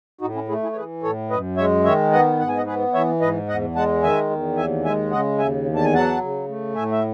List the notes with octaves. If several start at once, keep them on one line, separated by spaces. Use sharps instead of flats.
A2 D#4 F#4
C#4 E4
A3 E4 G#4
E4 G#4
C#5
E3 G#4 B4
A2 A4 C#5
F#2 B4 D#5
G#3 C#5 E5
D#3 C#5 E5
B3 D#5 F#5
G#2 F#5
G#5
D#5 F#5
B3 G#4 B4
E3 C#5 E5
G#2 B4 D#5
E2 D#5 F#5
G#3 F#5 A5
D#3 E5 G#5
E2
D#2 E5 G#5
G#3 E5 G#5
C#3 D#5 F#5
D#2 E5 G#5
E2
A5
G#5
F#3 F#5 A5
C#3
A3
A2 E5 G#5
E5